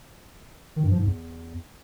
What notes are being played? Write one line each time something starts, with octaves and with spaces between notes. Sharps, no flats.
D#3
G2
F3
G#2
E2